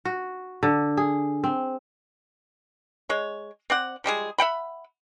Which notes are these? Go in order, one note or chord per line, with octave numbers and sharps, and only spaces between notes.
F#4
D3
G#4
C4
G#3 C#5
C4 D5 F#5
F3 G3 G#3 G#4
E5 F#5 G5 B5